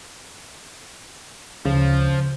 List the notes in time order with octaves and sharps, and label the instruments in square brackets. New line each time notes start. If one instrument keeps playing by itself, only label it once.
[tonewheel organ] D2 C#4 [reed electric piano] C#3 [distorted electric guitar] F3